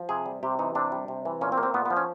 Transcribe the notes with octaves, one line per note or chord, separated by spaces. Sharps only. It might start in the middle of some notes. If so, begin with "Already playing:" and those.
Already playing: F3
C3 G#4
G3
C3 G4
E3 D#4
C3 D4
G3
C3
E3
A#2 C#4
C4
A#3
C4
A#2 B3
B3
F3
C#4